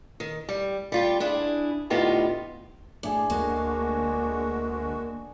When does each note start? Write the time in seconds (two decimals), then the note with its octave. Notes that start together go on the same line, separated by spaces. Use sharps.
0.20 D#3
0.49 G3
0.92 G3 F4 G4
1.20 D4 E4 G#4
1.90 D2 A2 B3 D#4 F4 G4
3.03 A2 D4 G#4
3.30 D2 G#3 A#3 F#4